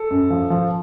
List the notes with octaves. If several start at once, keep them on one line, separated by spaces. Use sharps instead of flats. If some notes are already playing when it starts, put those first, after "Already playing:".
Already playing: A4
F#2
F3
F3